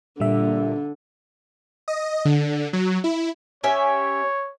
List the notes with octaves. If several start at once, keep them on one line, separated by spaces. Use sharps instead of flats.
A#2 D3 G3 E5
D#5
D3
F#3
E4
C#4 G4 C#5 E5